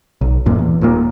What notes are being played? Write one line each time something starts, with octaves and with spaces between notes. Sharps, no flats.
B1
D#1 F#2 A#2
E2
D#1 D#2 A#2 A#3